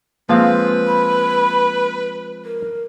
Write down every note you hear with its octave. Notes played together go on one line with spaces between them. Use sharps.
F3 G#3 A#3 C4 B4 F5
B5
A#4